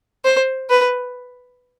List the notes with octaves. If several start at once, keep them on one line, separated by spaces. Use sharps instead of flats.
C5
B4